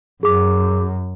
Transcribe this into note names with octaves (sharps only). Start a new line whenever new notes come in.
F#2 G#4 D6